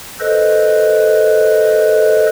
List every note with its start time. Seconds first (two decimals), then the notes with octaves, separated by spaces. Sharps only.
0.20 A4 B4 C5 D#5